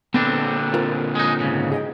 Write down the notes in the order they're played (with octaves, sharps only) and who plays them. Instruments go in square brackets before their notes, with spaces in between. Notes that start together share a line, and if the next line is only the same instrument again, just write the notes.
[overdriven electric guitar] A#2 D3 [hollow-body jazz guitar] B3 [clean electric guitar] C4 D4
[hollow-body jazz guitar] F4 A#4 C5
[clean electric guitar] G#3 D#4
G#2 C#3
[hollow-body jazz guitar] G#4 D#5 G5